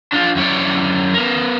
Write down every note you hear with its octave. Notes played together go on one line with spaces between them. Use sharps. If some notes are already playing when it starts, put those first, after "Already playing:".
D4 F4
F#2 E4 C#5 D5
B3 A#4